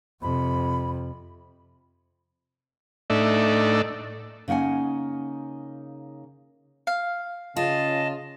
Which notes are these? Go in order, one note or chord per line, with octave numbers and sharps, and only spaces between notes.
F2 C3 B5
A2 A3 D4 D#4 D5 E5
C#3 A#3 D#4 F#5 G#5
F5
C#3 F4 D#5 A5